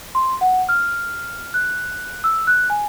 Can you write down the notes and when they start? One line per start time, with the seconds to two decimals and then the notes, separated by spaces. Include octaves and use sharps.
0.15 C6
0.41 F#5
0.69 F6
1.54 F#6
2.24 E6
2.47 F#6
2.70 G#5